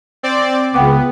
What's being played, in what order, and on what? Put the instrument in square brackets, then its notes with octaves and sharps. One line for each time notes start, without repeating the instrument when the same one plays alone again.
[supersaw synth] C4 D5
[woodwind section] C#2 C#3 [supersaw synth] B3 [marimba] F#5 G5 D6